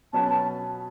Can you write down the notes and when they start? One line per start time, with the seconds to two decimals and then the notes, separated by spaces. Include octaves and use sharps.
0.13 B2 F#3 C#4 F#4 B4 A5
0.27 A5